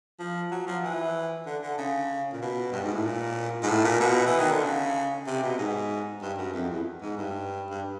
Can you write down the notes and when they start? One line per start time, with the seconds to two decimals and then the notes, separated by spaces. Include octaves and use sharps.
0.19 F3
0.51 F#3
0.67 F3
0.83 E3
1.46 D3
1.62 D3
1.78 C#3
2.33 A#2
2.41 B2
2.72 G2
2.83 G#2
2.94 A2
3.04 A#2
3.63 G#2
3.69 A2
3.84 A#2
4.00 B2
4.26 E3
4.38 D#3
4.51 D3
4.63 C#3
5.27 C3
5.43 B2
5.58 G#2
6.22 G2
6.38 F#2
6.54 F2
6.70 E2
7.02 G#2
7.17 G2
7.70 G2